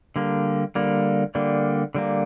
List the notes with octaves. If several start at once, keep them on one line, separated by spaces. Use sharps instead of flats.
D3 G3 A#3
D3 G3 A#3
D3 G3 A#3
D3 G3 A#3